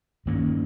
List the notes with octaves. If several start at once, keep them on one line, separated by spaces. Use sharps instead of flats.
G2 D#3 A#3 C#4